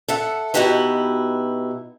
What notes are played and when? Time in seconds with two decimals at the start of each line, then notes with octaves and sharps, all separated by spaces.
0.08 A4 E5 F#5
0.54 B2 D#4 E4 F#4 G4 B4